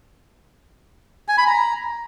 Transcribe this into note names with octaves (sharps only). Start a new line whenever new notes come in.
G#5
B5
A#5